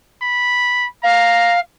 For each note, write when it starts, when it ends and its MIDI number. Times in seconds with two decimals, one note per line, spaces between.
0.22 0.87 83
1.03 1.60 77
1.03 1.55 82